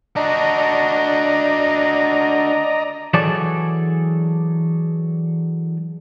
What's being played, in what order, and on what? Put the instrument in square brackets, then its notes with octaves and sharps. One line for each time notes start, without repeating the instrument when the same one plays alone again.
[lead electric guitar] D4 F#4 [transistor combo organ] D5 D#5 A#5
[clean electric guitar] E3 F#3 G#4 A4 C#5 D5